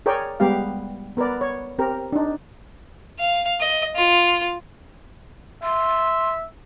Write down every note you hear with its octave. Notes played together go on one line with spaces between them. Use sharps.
G#4 A#4 C#5 D5 G5
G3 G#3 B3 G4 F5
B3 A#4 B4 D5
C#5
C4 G4 A#4
D4 D#4
F5
D#5
F4
E5 C6